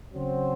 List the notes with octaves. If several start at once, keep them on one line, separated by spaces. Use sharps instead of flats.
C#3 F#3 C4